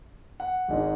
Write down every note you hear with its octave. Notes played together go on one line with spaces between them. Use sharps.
F#5
G#1 G#2 G#3 D4